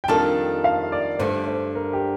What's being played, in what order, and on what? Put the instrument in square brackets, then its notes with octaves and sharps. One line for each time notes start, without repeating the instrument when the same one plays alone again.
[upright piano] G5
[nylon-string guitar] F2 D#3 G3 D4 A4 [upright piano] A5
[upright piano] F5
D5
[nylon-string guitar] G2 D3 A3 [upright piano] C5
[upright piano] C5
A#4
G4